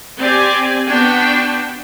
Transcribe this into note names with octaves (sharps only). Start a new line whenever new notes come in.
C4 G4 D5 G#5
B3 D4 F#4 G5